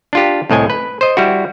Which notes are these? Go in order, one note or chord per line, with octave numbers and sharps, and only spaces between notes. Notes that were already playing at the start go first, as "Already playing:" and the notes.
D4 F4 G4
C2 A2 D#5 G#5
B4
C5 D#5
G3 E4 F#4